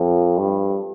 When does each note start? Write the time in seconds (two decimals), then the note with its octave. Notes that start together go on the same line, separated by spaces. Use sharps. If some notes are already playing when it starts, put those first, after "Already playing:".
Already playing: F2
0.38 G2